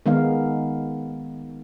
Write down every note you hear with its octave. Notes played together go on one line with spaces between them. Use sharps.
D#3 G#3 B3 D#4 F5